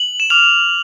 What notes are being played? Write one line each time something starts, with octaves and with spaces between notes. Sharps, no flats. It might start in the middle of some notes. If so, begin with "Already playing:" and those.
Already playing: F#7
E7
D6 F6 F7